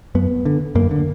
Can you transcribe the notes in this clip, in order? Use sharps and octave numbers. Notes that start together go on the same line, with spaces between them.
F#2 B3
D3
F#2 A#3
D3